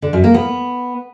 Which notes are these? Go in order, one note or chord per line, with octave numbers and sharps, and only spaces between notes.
D3
F#2
A#3
B3